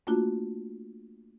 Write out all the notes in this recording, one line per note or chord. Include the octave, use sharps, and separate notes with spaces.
A3 A#3 D4 F4 F#4